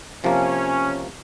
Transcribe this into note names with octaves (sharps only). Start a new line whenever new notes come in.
C3 F3 A#3 C#4